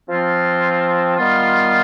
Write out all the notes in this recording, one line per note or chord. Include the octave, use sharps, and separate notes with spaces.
F3 C4 F4
D#3 G3 B3 F4